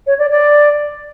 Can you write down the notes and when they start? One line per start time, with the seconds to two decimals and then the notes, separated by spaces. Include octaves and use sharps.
0.07 C#5
0.19 D5
0.31 D5